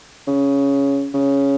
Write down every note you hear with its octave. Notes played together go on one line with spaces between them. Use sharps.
C#3
C#3